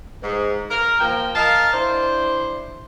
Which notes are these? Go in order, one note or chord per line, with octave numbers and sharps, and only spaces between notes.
G#2
A#4
F3 A#3 G5
A#4 D#5 F5 A5
D4 E4 C5